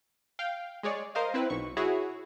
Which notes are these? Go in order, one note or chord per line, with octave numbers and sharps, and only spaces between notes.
F5 G5
G#3 G#4 C#5 D5
A#4 C5 D#5 F5
C4 E4 B4
B1 C#6
E4 F#4 G#4 C#5